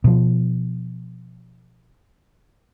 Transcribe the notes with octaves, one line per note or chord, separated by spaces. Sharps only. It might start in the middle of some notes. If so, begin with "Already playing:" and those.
B2 F3